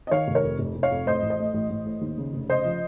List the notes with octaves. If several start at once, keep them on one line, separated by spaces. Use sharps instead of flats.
D#5
D#3 C#5 F5
F1
A#4 C#5
F2
F1
F1
C#5 F5
F2
A2 C5 D#5
A1
C5 D#5
A3
A1
A1
A2
D#2
C#3
F1
C#3 C5 D#5
F3